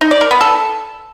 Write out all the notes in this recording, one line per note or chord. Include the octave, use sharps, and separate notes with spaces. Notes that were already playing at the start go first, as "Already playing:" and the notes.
D#4
D5
A#4
B3
A4